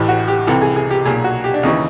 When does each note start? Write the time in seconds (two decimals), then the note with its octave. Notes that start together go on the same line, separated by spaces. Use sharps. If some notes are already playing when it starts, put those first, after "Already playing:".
Already playing: A1 A2 E3 G4
0.09 F#4
0.28 G4
0.47 C2 C3 E3 A4
0.62 G#4
0.76 G#4
0.91 G4
1.05 B1 A#2 G#4
1.24 F#4
1.44 G4
1.54 D4
1.63 D#2 C#3 E3 D#4